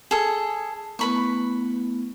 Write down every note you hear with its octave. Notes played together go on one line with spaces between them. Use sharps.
G#4 A4
A3 B3 E4 B4 B5 C#6